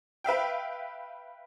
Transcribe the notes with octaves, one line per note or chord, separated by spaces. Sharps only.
B4 E5 F5 G5